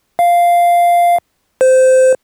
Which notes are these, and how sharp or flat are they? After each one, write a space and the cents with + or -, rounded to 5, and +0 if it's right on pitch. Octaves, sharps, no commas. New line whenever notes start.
F5 -5
C5 -15